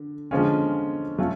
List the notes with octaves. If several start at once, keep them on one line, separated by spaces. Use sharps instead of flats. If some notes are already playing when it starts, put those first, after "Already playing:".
Already playing: D3
D3 F3 G#3 C#4 F4
F#3 A3 C#4 F4